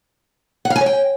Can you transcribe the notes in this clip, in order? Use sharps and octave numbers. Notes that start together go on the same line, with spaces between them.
F#5
F5
G#5
C#5
G5